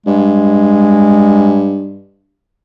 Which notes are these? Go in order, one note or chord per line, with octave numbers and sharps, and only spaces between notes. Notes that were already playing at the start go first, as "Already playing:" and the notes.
G2 G#3